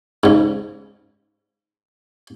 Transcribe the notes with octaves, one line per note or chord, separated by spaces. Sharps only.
G#2 C#3